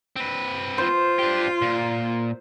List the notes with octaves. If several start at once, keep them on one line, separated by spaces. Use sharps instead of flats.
C4 B4
F4 C5
D4 G4
A#2